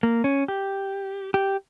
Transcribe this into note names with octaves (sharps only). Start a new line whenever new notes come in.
A#3
C#4
G4
G4